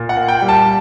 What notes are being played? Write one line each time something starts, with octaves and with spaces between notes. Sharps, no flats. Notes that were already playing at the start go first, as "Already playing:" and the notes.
Already playing: A#2
F#5
A#3
G5
G3
A5